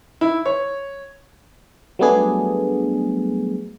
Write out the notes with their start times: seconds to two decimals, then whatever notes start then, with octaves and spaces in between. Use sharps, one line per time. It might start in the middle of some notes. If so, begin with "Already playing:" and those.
0.21 E4
0.46 C#5
1.99 F#3 G3 A3 B3 D4 G#4